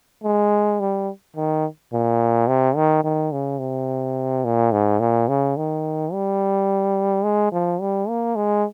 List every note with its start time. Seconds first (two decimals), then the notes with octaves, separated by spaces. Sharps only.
0.24 G#3
0.80 G3
1.36 D#3
1.93 A#2
2.48 C3
2.76 D#3
3.04 D#3
3.32 C#3
3.60 C3
4.45 A#2
4.72 G#2
5.00 A#2
5.28 C#3
5.57 D#3
6.13 G3
7.24 G#3
7.52 F3
7.81 G3
8.09 A#3
8.36 G#3